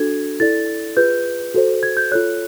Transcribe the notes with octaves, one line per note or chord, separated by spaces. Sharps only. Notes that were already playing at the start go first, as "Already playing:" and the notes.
Already playing: D4 F#4 A4 G#6
E4 A4 D5 A6
F4 G#4 B4 G6
F#4 A4 C5
G#6
G6
F4 A4 C#5 F#6